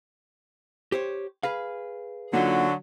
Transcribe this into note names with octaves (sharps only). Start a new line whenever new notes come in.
G4 C5 C#5
G#4 B4 F5
D3 F#3 A#3 D#4 F4